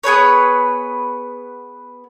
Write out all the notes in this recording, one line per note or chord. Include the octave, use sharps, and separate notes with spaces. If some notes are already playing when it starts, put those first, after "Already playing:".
B3 G#4 B4 C#5